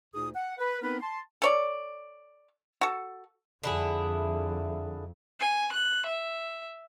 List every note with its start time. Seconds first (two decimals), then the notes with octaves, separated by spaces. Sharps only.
0.14 D2 A#2 D#4 G#4 D#6
0.35 F#5
0.58 B4
0.82 B3 C4 D#4 A#4 B4
1.00 A5 C6
1.42 A4 C#5 D5
2.81 F#4 A4
3.64 F2 D3 E4 G#4
5.40 G#5
5.73 F#6
6.06 E5